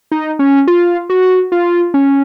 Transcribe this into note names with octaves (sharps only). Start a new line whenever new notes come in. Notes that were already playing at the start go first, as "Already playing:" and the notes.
D#4
C#4
F4
F#4
F4
C#4